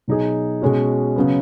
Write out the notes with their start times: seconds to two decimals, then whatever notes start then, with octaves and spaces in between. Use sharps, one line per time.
0.08 B2 F#3 D#4 G#4
0.62 B2 G#3 C#4 F#4
1.16 C#3 F#3 B3